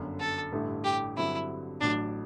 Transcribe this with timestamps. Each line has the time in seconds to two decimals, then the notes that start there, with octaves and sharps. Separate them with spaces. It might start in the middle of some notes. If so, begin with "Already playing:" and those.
Already playing: G1 F#2 D3
0.20 A4
0.52 A1 G2 D3 A3 E4
0.84 G4
1.17 G2 D3 F#3 C4 E4
1.81 A1 A2 F#3 D4